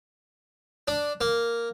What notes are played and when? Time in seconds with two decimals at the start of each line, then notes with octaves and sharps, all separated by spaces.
0.88 D4
1.21 A#3